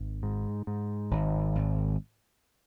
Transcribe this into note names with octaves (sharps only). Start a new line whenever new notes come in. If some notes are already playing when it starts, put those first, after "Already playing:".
Already playing: G#1
G#2
G#2
G#1
G#1